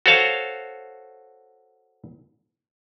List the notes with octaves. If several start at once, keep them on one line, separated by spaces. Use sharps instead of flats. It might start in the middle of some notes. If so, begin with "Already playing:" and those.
F#4 A4 C5 C#5 F5